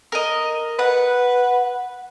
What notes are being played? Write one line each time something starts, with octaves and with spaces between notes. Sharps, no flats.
A#4 D#5
B4 F#5